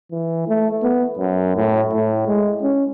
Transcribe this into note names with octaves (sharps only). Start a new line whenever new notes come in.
E3
A3
B3
F#2
A2
A2
G#3
C#4